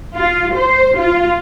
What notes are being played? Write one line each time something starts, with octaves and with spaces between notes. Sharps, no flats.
F4
C5
F4